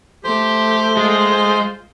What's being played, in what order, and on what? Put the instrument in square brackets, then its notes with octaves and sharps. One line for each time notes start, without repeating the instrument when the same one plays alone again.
[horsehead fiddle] A3 [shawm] G4 [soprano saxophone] C5
[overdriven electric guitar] G#3 [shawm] F4